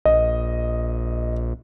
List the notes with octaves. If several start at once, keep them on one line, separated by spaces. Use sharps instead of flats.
A#1 D#5